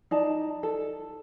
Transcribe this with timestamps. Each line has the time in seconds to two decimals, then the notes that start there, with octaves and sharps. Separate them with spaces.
0.11 D#4 D5 A5
0.63 A4